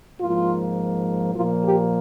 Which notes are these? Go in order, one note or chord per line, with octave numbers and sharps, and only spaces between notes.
G#2 F3 A#3 F4
A#2 F3 A#3 F4
G4